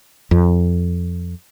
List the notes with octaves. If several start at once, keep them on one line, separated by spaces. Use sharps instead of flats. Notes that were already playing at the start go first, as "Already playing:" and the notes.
F2